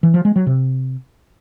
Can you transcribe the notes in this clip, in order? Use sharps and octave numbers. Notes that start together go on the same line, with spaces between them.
E3
F3
G#3
F#3
C3